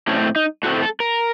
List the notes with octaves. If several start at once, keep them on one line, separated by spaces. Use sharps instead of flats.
A2 A3 C4 C#4
D#4
A2 A3 C4 F#4
A4
A#4